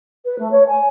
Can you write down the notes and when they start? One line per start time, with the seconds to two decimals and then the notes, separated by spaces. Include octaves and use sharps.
0.25 B4
0.38 A3
0.51 C#5
0.67 G#5